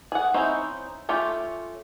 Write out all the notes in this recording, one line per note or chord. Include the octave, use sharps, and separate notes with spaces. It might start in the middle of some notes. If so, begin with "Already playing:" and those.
G#4 F#5
C4 C#4 D#4 E4 C5
A3 C#4 F4 G4